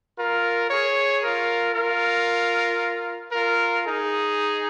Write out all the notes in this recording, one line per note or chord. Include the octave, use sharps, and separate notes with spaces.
F4 A#4
G#4 C#5
F4 A#4
F4 A#4
F4 A#4
D#4 G#4